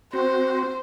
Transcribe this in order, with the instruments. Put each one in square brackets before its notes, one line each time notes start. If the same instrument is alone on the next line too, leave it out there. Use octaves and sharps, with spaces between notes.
[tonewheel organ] C4 F#4 [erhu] C5